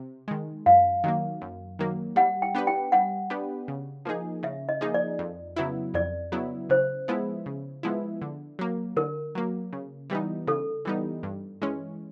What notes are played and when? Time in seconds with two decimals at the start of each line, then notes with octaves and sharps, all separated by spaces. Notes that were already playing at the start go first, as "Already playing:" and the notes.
Already playing: C3
0.28 D#3 G#3
0.66 F#2 F5
1.04 D#3 F#3 A#3
1.41 F#2
1.79 D#3 F#3 A#3
2.16 G3 F#5
2.42 G5
2.55 B3 D4 G4 B4
2.67 G5
2.92 G3 F#5
3.30 B3 D4 G4 B4
3.68 C#3
4.05 F3 A#3 D#4 G#4
4.43 C#3 E5
4.69 D#5
4.81 F3 A#3 D#4 G#4
4.94 D5
5.19 F2
5.56 C#3 F#3 B3 E4
5.94 F2 D5
6.32 C#3 F#3 B3 E4
6.70 C#3 C5
7.08 F3 G#3 B3 E4
7.46 C#3
7.83 F3 G#3 B3 E4
8.22 D3
8.59 F#3 A#3
8.96 D3 A#4
9.35 F#3 A#3
9.73 C#3
10.10 E3 G3 B3 D#4
10.47 C#3 A4
10.85 E3 G3 B3 D#4
11.23 G2
11.62 E3 G#3 C#4